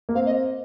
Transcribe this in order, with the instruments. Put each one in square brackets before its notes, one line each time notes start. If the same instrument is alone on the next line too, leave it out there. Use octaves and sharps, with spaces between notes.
[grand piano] A#3
[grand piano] C4 [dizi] F5
[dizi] D#5